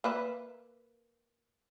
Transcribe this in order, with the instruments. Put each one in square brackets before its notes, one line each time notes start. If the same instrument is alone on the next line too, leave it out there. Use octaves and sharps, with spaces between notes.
[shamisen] A#3 B4 E5